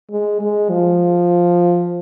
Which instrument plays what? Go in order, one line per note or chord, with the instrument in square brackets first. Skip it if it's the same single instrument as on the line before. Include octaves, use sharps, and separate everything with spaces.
[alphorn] G#3
G#3
F3